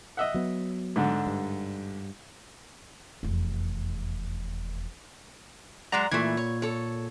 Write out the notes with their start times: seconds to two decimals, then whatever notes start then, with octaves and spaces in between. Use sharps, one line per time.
0.17 D#5 E5 F#5
0.34 F#3 B3
0.96 G#2 D3
1.27 G2
3.23 F1 E2
5.92 F#3 G#3 D5 F#5 A#5
6.12 A#2 E3 A3 G#6
6.37 C#5
6.62 A4 C#5